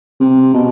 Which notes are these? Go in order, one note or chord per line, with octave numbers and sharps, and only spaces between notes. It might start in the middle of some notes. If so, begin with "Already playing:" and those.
C3
B2